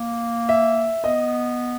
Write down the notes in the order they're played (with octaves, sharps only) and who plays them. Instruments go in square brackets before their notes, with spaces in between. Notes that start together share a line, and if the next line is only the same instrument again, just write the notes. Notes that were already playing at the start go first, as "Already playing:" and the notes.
Already playing: [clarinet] A#3
[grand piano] E5
[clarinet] B3 [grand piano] D#5